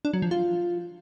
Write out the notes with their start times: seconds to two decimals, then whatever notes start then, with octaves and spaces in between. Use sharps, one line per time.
0.05 D4
0.13 F#3
0.22 F3
0.31 F4